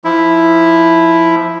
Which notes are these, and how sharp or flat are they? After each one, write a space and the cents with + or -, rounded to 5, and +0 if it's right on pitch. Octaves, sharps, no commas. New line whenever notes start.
F3 -15 E4 +0